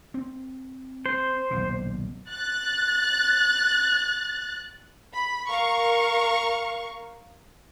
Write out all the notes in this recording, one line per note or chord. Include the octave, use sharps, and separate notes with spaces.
C4
C5
D#1 B1 C3
F#6 A6
B5
A#4 F5 C#6